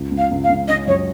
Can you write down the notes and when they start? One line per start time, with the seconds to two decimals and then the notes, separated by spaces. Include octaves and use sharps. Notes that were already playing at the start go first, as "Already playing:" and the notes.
Already playing: C#2
0.11 C#2
0.17 F5
0.31 C#2
0.43 F5
0.49 C#2
0.68 C#4 D#5
0.87 F#2 C#5